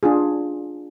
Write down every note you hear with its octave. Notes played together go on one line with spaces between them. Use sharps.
D4 F4 G#4